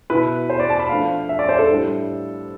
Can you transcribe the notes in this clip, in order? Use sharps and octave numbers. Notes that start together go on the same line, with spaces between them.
B2 B3 E4 B4
C5
D5
A5
B5
F3 A3 D4 F5
E5
D5
C5
A4
A2 G3 D4